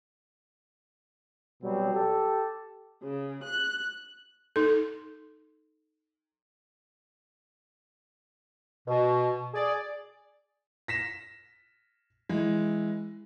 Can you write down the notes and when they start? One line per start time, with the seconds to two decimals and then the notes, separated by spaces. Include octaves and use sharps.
1.63 B2 F#3 G3 C4
1.94 G4 A4
3.02 C#3
3.43 F#6
4.56 D#4 A4
8.87 B2
9.53 G#4 D5
10.88 A#6 B6 E7
12.29 E3 G#3